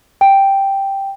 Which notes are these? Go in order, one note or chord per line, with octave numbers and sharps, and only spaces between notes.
G5